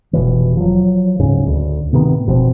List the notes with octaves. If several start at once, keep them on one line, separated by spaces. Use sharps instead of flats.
F1 B2 E3
F3 F#3
D1 G#2 C#3 C#4
D2
A2 C3 D#3 B3
F1 B2 F3 C4